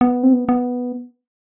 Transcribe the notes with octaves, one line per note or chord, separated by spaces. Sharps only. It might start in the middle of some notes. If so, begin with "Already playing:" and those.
B3
C4
B3
B3